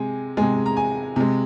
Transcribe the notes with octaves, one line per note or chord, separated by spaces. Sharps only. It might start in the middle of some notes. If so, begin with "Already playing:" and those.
Already playing: C3 G#3 G#5
C3 G#3 G#5
A#5
G#5
C3 G#3